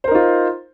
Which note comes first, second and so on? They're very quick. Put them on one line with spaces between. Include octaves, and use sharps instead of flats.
C5 A#4 D#4 F4